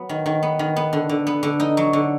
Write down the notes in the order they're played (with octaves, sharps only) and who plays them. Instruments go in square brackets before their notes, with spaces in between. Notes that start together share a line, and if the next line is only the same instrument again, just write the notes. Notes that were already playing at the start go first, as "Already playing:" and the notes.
Already playing: [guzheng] F#3 B3
D#3
D#3
B3
D#3
B3
D3
D3
B3
D3
D#4
F#3
D3